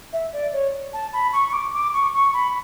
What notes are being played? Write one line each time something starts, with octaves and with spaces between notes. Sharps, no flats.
E5
D5
C#5
A5
B5
C#6
C#6
D6
D6
C#6
C#6
B5